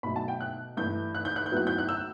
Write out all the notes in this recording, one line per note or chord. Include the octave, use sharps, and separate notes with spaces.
B2 F#3 A3 B5
A5
G5
F#6
G2 E3 A3 G6
F#6
G6
F#6
G6
A2 F#3 B3 F#6
G6
F#6
E6